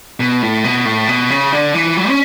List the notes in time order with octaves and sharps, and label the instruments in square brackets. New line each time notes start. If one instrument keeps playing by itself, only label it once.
[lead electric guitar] B2
A2
B2
A2
B2
C#3
D3
E3
F#3
C#4